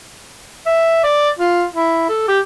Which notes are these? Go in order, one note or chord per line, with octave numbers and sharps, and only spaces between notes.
E5
D5
F4
E4
A4
G4